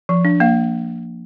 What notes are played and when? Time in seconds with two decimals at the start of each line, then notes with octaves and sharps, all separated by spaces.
0.09 F3
0.25 D4
0.40 A#3 F5